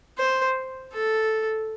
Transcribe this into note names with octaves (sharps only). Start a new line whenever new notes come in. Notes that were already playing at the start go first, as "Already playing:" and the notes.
C5
A4